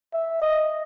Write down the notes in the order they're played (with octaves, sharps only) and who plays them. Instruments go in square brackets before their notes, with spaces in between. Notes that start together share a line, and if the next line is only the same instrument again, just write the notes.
[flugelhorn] E5
D#5